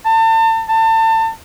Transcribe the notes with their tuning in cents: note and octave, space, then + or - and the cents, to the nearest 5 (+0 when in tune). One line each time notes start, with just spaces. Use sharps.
A5 +35
A5 +30